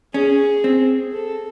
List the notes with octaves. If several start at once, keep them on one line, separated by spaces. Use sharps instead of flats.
C#4 G#4
C4
A4